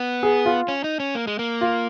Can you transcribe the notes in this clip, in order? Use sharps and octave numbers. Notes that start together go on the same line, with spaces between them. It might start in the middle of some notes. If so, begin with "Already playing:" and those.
Already playing: B3
G#4
F4
C#4
D#4
C#4
A#3
G#3
A#3
F4